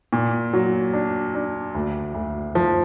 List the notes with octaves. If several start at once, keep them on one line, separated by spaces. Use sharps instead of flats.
A#2
F#3
D4
D4
D2
D2
F3